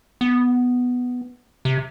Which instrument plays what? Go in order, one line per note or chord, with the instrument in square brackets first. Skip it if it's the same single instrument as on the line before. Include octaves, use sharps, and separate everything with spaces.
[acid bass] B3
C3